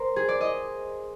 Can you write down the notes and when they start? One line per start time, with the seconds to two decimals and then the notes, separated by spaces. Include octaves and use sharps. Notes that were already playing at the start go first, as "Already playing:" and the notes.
Already playing: A#4 C5
0.16 G#4
0.29 D5
0.41 D#5